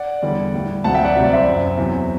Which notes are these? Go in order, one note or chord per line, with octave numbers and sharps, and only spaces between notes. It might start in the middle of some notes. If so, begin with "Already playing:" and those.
Already playing: D5 F#5
E2 D3 G3
A2 G3
D2 C3 F#3 F#5 A5
E5 G5
D5 F#5
C2 C3 F#3 E5
D5
C5 E5
F#2 F#3
E2 C3 F#3